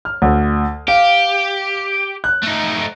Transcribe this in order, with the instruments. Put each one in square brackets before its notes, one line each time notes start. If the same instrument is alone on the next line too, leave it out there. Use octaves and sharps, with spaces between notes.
[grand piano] F6
D2
[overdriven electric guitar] G4 [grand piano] F5
[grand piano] F#6
[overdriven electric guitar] A3 D#4